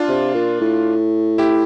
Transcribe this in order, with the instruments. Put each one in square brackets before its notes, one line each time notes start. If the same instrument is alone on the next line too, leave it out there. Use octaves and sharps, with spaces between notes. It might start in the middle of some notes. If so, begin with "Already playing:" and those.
Already playing: [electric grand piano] D4 F4
[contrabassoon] C3
A#2
A2
[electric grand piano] E4 G4